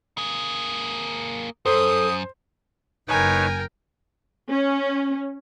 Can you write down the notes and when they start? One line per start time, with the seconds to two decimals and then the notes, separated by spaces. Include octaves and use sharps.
0.18 A#3 G#4
1.66 F#2 A4 C5 D#6
3.09 F#1 D#4 A#4 B4 C#5 G5 G#5
4.49 C#4